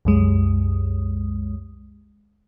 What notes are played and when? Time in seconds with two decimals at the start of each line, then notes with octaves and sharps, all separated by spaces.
0.05 C2 F#2 G#3